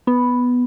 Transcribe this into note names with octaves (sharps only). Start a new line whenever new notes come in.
B3